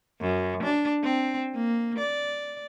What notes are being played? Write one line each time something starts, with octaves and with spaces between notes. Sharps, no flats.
F#2
D4
C4
A#3
D5